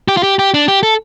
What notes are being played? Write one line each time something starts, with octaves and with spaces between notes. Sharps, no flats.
G4
F4
G4
G4
D4
G4
A4